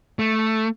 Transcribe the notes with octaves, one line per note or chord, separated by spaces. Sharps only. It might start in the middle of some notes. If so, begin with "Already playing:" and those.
A3